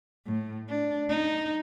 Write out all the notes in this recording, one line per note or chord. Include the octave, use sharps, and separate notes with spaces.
A2
D4
D#4